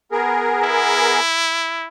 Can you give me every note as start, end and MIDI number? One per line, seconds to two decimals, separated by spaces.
0.12 1.20 59
0.12 1.20 68
0.12 1.20 70
0.63 1.88 64